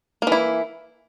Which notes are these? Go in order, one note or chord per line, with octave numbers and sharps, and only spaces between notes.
E3 A#3 E4